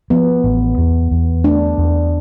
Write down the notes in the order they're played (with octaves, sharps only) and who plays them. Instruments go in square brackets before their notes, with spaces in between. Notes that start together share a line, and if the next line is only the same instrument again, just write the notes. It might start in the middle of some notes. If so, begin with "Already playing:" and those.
[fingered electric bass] F3 [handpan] B3
[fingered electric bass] A1
E2
E2
[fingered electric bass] A3 [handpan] D4
[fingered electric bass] E2